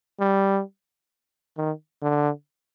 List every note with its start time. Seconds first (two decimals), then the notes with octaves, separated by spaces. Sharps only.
0.20 G3
1.58 D#3
2.02 D3